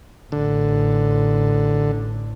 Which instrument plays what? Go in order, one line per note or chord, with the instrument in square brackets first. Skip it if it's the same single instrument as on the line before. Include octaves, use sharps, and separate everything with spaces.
[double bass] A1 [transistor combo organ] D3